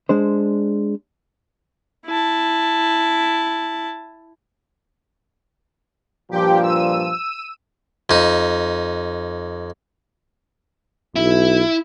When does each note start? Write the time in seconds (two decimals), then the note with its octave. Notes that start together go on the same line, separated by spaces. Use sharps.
0.09 G#3 D4 C5
2.06 E4 A5
6.31 G2 A#2 F3 G4 G5
6.62 E6 D#7
8.10 F2 D#4
11.16 B1 E4